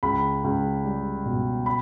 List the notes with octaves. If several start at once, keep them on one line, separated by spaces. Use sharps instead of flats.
C#2 B5
C#2
G3
B2
B5